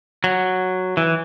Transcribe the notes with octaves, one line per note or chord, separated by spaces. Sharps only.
F#3
E3